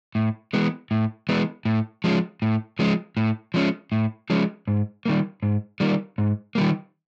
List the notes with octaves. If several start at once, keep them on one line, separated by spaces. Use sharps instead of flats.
A2
E3 G#3 B3
A2
E3 G#3 B3
A2
F3 G#3 C#4
A2
F3 G#3 C#4
A2
F3 G#3 C#4
A2
F3 G#3 C#4
G#2
D#3 G3 A#3
G#2
D#3 G3 A#3
G#2
D#3 G3 A#3